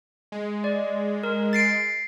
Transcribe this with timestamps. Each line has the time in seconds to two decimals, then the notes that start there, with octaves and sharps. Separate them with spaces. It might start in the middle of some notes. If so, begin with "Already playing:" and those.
0.32 G#3
0.64 D5
1.23 A#4
1.53 A6 C7 D7